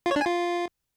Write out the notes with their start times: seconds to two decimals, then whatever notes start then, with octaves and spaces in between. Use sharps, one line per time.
0.06 F4
0.11 C#5
0.16 D4
0.21 G#5
0.26 F4